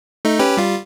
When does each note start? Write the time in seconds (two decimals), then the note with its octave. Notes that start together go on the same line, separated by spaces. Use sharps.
0.25 A3 D#4
0.39 C#4 G4 B4
0.57 G3 F4